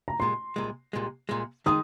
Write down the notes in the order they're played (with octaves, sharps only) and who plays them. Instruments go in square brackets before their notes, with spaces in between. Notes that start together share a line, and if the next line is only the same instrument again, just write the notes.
[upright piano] A#5
[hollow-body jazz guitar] C2 A#2 G#3 [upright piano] C6
[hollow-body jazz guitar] C2 A#2 G#3
C2 A#2 G#3
C2 A#2 G#3
[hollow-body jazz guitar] D#3 G#3 D#4 [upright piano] D#6